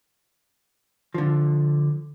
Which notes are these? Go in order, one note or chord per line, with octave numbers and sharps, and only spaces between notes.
D3 F3